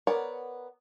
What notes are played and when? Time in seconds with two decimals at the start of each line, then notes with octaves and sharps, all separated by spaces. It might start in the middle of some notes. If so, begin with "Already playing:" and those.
0.07 B3 A#4 C#5 D5 F#5